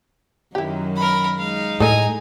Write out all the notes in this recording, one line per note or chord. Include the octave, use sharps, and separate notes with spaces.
F#2 D#3 F#3 E4 G4
A#4 B5
G#3 D#4 F5
A2 G#4 A4 D#5 G#5 A#5